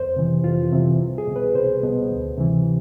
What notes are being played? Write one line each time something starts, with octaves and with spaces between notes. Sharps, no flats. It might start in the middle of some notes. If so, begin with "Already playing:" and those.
Already playing: F2 C5
C3 E3
F2 F4
C3 E3
C2
G#4
B2
B4
C2 C5
B2
D2
C3 E3